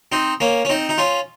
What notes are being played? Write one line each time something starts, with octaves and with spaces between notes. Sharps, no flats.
C4 D#4
A#3 C#4
C#4
C4 D#4
D#4
C#4 F4